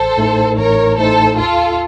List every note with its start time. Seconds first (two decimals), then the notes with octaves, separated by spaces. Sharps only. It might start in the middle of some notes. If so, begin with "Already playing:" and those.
Already playing: A1 A4 C5
0.17 A2 A3 D#4
0.57 A1 A#4 C#5
0.98 A2 A3 D#4 A4 C5
1.39 D#2 F4 A4